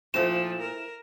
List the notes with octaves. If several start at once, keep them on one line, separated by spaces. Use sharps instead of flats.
A#2 F3 A3 E4 C5 E7
A#4